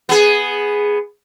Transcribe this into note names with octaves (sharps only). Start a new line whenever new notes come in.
B3 G#4